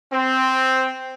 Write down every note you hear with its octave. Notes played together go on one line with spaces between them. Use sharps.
C4